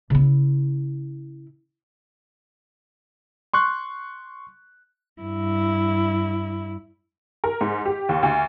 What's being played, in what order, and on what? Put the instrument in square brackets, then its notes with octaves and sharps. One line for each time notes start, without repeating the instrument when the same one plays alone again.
[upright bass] C#3 E4
[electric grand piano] C6 C#6 F#6
[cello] G2 E4
[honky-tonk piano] A#4
G#2
G4
D#2
D2